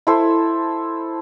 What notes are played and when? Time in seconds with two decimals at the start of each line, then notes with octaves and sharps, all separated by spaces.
0.07 E4 A4 C5